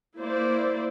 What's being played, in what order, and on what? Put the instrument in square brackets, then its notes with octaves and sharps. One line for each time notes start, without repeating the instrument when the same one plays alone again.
[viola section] A#3 E4 C5 D5